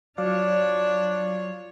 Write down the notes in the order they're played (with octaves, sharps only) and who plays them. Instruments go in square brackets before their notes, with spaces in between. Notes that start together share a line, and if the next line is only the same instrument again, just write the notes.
[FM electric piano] F#3 D5 F5 [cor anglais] D4 [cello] F4 C#5